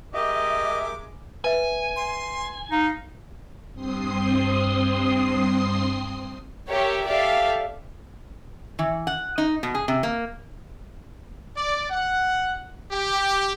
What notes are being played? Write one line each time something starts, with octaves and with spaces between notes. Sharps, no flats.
G#3 G4 A#4 D#5 E5 D6
B4 E5 G#5
C6
D#4 F5
G2 C4 C6 D#6 C7
G4 A#4 C#5 E5
G4 A4 D5 E5 F5
E3
F#5
D#4
B2
G#4
C3
A#3
D5
F#5
G4